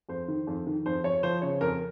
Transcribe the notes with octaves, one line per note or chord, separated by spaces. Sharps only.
F2 C5
D#3
F2
D#3
F2 C5
F2 C#5
F3 C5
C#3 C#5
F2 A#4